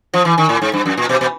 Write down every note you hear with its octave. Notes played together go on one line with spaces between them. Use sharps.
F3
E3
D#3
A2
G#2
G2
F#2
A#2
B2
B2